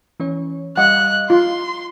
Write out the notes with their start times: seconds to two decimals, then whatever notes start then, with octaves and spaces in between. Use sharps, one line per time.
0.20 E3 C#4 C#5
0.77 G3 D#5 F5 F#5 F#6
1.30 F4 C6